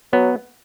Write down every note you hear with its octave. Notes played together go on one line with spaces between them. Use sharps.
F#3 B3